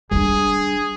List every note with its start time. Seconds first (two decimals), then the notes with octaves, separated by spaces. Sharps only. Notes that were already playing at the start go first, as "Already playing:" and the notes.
0.11 G3 D4 G#4